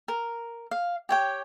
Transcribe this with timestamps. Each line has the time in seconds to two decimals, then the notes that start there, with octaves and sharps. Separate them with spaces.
0.08 A#4
0.71 F5
1.09 G4 C#5 G5